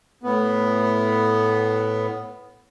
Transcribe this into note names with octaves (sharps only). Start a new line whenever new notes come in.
A2 B3